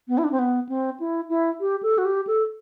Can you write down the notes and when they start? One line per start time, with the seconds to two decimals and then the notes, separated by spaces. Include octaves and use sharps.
0.08 B3
0.18 E4
0.24 D4
0.31 C4
0.39 B3
0.69 C4
1.00 E4
1.29 E4
1.60 G4
1.83 A4
1.98 F#4
2.05 G4
2.27 A4